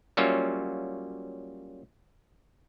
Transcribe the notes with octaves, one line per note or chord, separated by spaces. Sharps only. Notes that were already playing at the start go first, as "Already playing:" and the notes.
F#3 G3 A#3 C#4 F4 E5